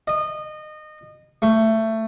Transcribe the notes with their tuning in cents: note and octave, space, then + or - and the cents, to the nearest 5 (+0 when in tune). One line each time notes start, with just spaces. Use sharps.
D#5 -25
A3 +15